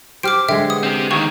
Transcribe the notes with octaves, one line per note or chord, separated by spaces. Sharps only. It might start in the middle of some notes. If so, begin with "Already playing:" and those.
G4 C5 D6 F6 D7
D3 G#3 E5 G5
B3 D#6
C4 G4
D#2 D#3 C#6